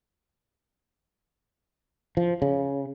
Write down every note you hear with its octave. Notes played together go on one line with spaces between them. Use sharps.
F3
C#3